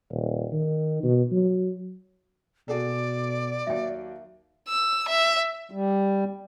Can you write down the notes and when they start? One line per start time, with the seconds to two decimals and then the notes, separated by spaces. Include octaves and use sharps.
0.10 D#1
0.52 D#3
1.03 B2
1.32 F#3
2.68 B2 F#4 G#4 A4 D5
3.67 D#2 F#3 E5 G5
4.68 E6
5.08 E5
5.71 G3